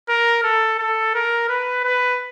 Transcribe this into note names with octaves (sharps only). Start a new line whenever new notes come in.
A#4
A4
A4
A#4
B4
B4